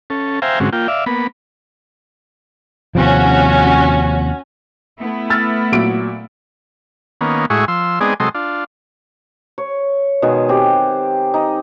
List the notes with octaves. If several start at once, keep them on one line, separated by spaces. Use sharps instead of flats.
C#4 A4
C5 E5 F5 G5 G#5 A#5
G#2 D3 G#3 C4 C#4 F#4
A#3 F4 G5
D5 E5 F5
A#3 B3 B5
D#2 C3 F3 C#4 F#4
A3 B3 E4
E6 F6 A6
A#2 F#3 D7
D#3 A#3 B3 C#4
A2 G#3 E4 F#4 G#4 C#6
F3 C6 E6
G#3 B3 C4 D#4 G#4 D5
C3 F#3 G#3 A4 D#5 C6
D4 F4
C#5
B2 D#3 G#3 G#4
C4 G4
D#4